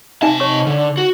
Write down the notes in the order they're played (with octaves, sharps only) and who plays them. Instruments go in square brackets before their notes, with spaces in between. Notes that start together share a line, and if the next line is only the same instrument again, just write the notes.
[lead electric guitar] C3 A5 [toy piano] D#4 E5 G#5
[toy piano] C#5 C#6
[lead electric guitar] D3
F#4